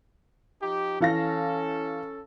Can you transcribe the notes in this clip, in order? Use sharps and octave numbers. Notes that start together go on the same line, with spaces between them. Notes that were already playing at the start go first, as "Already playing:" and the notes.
F3 D#4 G4
E3 C#4 A4 F5 A#6